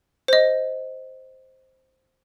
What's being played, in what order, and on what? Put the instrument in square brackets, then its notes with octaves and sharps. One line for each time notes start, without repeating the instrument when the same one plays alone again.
[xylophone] C5 D#5